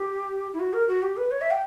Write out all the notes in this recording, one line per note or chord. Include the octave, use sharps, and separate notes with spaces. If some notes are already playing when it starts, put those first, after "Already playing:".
Already playing: G4
E4
F#4
A#4
F#4
G4
B4
C#5
E5
G5